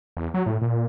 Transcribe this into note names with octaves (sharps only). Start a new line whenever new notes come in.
E2
F#3
A2
A#2